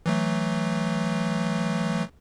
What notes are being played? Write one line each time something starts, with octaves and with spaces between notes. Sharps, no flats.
E3 F#3 A3